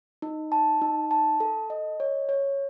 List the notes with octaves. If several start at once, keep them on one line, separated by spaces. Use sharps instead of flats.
D#4
A5
D#4
A5
A4
D#5
C#5
C#5